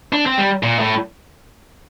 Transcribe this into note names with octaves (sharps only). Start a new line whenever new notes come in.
D4
C4
G3
A#2
A2